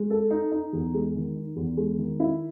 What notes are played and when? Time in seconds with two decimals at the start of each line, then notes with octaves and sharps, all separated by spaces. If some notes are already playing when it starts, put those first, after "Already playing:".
Already playing: G#3
0.10 A4
0.31 D#4
0.52 D#4
0.73 E2
0.94 G#3
1.15 D#3
1.36 D#4
1.56 E2
1.77 G#3
1.98 D#3
2.20 E4